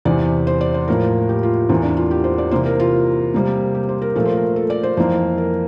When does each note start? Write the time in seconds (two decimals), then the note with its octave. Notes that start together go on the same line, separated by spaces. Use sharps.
0.05 E2 C3 E3 D5
0.47 C5
0.61 D5
0.74 C5
0.88 A2 F3 A#3 A#4
1.29 G4
1.43 F4
1.69 E2 E3 A#3 C4
1.83 D4
1.97 F4
2.11 G4
2.24 C5
2.38 D5
2.51 C3 E3 A#3 C5
2.66 A#4
2.80 F4
3.34 C3 G3 A#3
3.74 G4
3.89 C5
4.02 A#4
4.16 A#2 F3 A3 A#4
4.25 C5
4.37 A#4
4.56 A4
4.70 D5
4.83 C5
4.97 F2 E3 A#3 C5
5.38 A#4